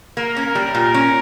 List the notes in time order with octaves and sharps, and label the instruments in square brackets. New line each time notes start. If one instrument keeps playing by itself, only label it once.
[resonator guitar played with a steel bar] A#3 [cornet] A#4
[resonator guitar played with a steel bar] C#4
[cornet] A#4
[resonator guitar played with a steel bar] G3
A#2
C#4